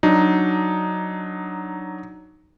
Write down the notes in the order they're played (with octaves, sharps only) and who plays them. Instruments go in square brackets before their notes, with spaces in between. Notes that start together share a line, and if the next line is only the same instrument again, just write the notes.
[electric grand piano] F#3 D4 D#4